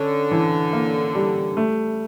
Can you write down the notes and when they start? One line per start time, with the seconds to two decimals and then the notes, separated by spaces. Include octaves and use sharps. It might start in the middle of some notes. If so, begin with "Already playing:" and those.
Already playing: D3 C#4
0.31 E3
0.73 A#3
1.15 G3
1.57 A3